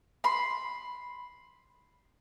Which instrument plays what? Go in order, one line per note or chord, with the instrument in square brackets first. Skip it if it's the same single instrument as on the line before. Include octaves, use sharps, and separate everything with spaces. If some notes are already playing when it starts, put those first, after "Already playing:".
[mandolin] B5 C6